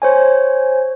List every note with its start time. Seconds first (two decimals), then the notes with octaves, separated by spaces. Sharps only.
0.02 C5 C#5 G#5